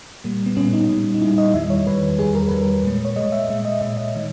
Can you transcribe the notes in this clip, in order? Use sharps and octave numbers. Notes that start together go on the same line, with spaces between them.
A#2 G3 A#3
B3
A#2 G3 C#4
D#4
A#2 G3
D#4
A#2 G3 E4
D#5
E2 D#3 G3 E5
C#5
E2 D#3 G3 B4
B4
E2 D#3 G3 G#4
A#4
E2 D#3 G3 B4
A#4
A#2 G#3
C#5
A#2 G#3 D#5
E5
A#2 G#3 E5
D#5
A#2 G#3 E5
D#5
D#3 G#3